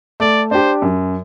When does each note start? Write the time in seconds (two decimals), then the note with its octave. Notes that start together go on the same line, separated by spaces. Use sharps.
0.20 A3 D5
0.51 D4 G4 C5
0.82 F#2